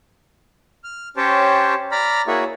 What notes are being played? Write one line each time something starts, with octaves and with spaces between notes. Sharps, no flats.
F6
C#4 G4 C5 C#5 G5 A5
D5 A#5 B5 F6
A#3 E4 F#4 G#4 C#5 E5